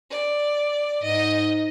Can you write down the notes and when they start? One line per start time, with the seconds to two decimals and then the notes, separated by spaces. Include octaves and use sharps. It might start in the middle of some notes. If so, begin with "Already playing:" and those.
0.10 D5
1.03 G#2 D#5